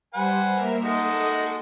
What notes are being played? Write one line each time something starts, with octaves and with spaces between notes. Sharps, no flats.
G3 B4 C5 F#5 G#5
A#3 A#4 E5
G#3 D#4 F#4 A4 D#5